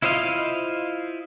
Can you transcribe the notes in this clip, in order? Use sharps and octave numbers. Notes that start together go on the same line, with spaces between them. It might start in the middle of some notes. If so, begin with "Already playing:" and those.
E4 F4 C5 D#5 F5